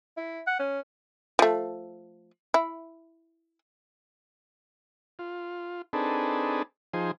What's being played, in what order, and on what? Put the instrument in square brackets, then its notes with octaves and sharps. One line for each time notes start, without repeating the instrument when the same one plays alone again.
[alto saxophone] E4
F#5
C#4
[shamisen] F3 A3
E4
[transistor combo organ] F4
C4 D4 D#4 G#4 A4 B4
F3 D#4 G#4 C5